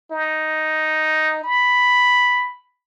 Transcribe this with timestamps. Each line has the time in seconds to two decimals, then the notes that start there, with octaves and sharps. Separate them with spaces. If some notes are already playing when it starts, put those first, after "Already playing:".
0.11 D#4
1.44 B5